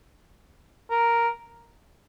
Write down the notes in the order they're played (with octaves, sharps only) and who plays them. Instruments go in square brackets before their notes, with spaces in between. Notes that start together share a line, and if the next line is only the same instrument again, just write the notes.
[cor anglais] A#4